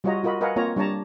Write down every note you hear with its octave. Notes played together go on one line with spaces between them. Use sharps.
G3 F4 F#4 C#5 D#5 A#5
F4 F#4 A#4 D#5 B5
A#4 B4 D#5 F5 F#5 G#5
A#3 C4 F4 A#4 C#5 A#5
G3 D4 C#5 A5 A#5